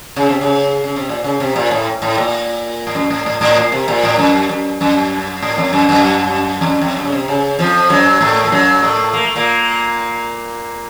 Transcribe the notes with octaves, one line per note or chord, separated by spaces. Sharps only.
C#3
C3
C#3
C#3
C3
A#2
C#3
C3
A#2
A2
A2
A#2
A2
F#2
A2
A2
A2
A#2
C3
A#2
A2
F#2
F#2
F#2
A2
F2
F#2
F#2
F2
F#2
F2
F#2
C#3
C3
C#3
F2 F3
F#2 F#3
A2 A3
A3
F#2 F#3
A2 A3
A#3
A3
A#2 A#3